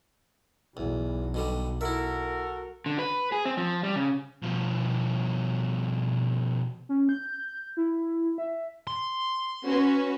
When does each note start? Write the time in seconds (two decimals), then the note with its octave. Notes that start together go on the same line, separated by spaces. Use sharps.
0.77 B1 E2
1.34 B2 D3 G3
1.81 E4 F#4 A4 A#4 E5
2.86 D3
2.99 B4
3.32 G#4
3.45 C4
3.57 F3
3.83 G3
3.96 C#3
4.43 B2 F3
6.89 C#4
7.09 G6
7.77 E4
8.38 E5
8.87 C6
9.67 C#4 F#4 B4